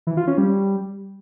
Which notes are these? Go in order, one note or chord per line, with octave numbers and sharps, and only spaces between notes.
E3
F4
C#4
G3